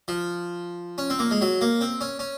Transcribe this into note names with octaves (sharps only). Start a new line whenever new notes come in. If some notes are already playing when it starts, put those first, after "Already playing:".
F3
C#4
C4
A#3
G#3
F#3
A#3
C4
C#4
C#4